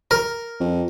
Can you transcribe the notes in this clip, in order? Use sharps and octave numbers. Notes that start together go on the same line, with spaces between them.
A#4
F2